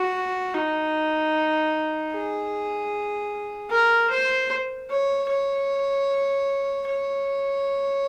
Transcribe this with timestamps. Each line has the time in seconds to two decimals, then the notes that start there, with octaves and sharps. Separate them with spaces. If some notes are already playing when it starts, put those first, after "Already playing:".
Already playing: F#4
0.54 D#4
2.13 G#4
3.70 A#4
4.10 C5
4.90 C#5
5.30 C#5
6.88 C#5